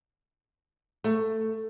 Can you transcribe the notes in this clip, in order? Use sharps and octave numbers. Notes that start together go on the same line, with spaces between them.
A3